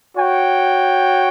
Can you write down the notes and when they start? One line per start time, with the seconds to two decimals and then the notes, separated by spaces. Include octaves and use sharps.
0.17 F#4 C#5 G5